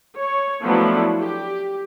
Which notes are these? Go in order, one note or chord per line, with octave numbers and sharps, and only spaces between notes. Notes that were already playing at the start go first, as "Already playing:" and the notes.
C#5
F3 F#3 A3 B3 D4 E4
G4